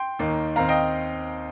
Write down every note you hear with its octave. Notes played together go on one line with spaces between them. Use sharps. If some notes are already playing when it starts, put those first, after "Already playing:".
Already playing: G5 C6
D#2 D#3 A#3 D#4
D#2 D#3 C4 F5 A#5
D#5 G5